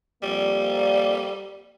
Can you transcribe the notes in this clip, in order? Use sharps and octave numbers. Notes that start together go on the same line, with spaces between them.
F2 G3 A#3 D5